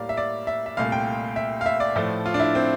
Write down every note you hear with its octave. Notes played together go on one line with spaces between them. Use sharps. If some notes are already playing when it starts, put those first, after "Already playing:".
Already playing: A2 G3 A#3 D5 F5
E5
D5
E5
E5
C2 A#2 A3 F5
G5
E5
F5
E5
D5
A2 F3 A3
F4
D4
E4
C4